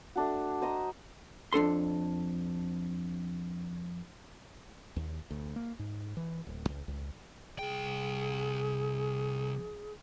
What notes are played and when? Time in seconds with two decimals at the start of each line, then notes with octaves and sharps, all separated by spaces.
0.16 A3 D4 F#4
0.62 C5 D#5 A#5
1.53 F2 D4 A4 C6
4.96 D#2
5.31 D2
5.56 A#3
5.79 G#2
6.17 E3
6.47 D1
6.69 C#2
6.88 C#2
7.59 C2 G#4 G5